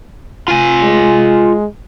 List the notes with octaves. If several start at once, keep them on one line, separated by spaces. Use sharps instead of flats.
F4 G#5
G#3